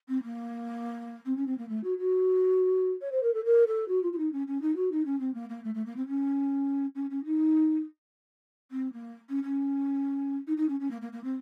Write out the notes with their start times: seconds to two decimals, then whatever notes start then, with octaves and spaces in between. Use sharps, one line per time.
0.09 C4
0.24 A#3
1.26 C4
1.37 C#4
1.47 C4
1.58 A#3
1.69 A3
1.84 F#4
1.98 F#4
3.01 C#5
3.12 C5
3.23 A#4
3.34 A4
3.45 A#4
3.67 A4
3.88 F#4
4.03 F4
4.13 F4
4.18 D#4
4.33 C#4
4.47 C#4
4.62 D#4
4.76 F#4
4.92 D#4
5.05 C#4
5.20 C4
5.34 A#3
5.49 A#3
5.64 A3
5.75 A3
5.86 A#3
5.97 C4
6.08 C#4
6.95 C#4
7.10 C#4
7.25 D#4
8.71 C4
8.93 A#3
9.29 C#4
9.44 C#4
10.47 D#4
10.57 D#4
10.69 C#4
10.80 C#4
10.91 A#3
11.02 A#3
11.13 A#3
11.24 C4